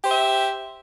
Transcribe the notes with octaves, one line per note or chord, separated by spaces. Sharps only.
G4 C5 E5